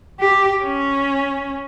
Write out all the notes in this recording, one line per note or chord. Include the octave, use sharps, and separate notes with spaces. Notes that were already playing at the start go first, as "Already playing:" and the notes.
G4
C#4